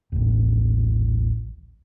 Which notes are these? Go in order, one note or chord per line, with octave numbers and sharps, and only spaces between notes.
D#1 A1